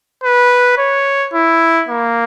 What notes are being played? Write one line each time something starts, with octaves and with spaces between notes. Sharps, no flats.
B4
C#5
E4
A#3